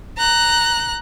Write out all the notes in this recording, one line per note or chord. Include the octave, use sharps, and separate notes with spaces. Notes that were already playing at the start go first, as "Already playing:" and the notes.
A#5 F#6